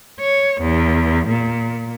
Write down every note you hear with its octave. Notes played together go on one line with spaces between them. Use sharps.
C#5
E2
A#2